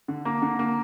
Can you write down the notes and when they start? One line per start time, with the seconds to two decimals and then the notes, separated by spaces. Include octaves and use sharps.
0.08 D3
0.25 A#3
0.42 D3
0.59 A#3